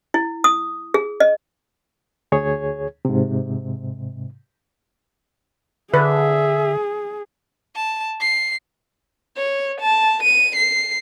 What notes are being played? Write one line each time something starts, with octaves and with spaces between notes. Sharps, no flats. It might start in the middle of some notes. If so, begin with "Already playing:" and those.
E4
D#6
G#4
D#5
D2 G#4 C#5 G#6
G#2 C3
D3 G#4 B4 E5
A5
C7
C#5
A5
D#7
C7